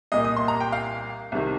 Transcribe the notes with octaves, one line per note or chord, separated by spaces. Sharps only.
C2 A#2 A#3 D#5
D#6
C6
A#5
G5
F5
C2 C3 D#3